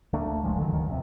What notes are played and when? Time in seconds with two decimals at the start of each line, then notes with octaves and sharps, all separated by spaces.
0.13 D2 A3 A#3 D4
0.43 D#1 A1 F3 G#3
0.58 D3 D#3 F#3
0.72 C#2 G2 D#3 F3
0.87 E1 A2 C3